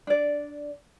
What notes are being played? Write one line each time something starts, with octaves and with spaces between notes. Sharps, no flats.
D4 D5